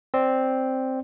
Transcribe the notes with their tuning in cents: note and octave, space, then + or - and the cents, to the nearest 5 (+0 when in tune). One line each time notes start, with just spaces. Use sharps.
C4 +0 D5 +0